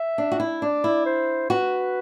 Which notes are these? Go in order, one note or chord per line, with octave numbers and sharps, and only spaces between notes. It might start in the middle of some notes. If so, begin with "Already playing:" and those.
Already playing: E5
D4
F#4
E4
D4 D5
E4
C5
F#4 B4